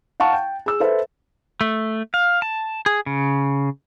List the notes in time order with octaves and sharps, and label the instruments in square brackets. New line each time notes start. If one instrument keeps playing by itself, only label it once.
[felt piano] F5 F#5 A5 C#6
G5
G#4 E6
A4 B4 C5 E5
[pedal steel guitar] A3
F5
A5
G#4
C#3